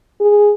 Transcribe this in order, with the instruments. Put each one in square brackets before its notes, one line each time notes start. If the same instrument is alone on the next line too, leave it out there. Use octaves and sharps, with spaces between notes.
[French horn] G#4